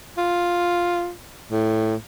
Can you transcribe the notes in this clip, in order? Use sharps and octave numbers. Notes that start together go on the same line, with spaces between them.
F4
A2